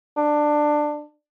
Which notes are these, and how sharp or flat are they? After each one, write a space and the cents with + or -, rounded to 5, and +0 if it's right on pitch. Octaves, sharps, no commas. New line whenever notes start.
D4 +15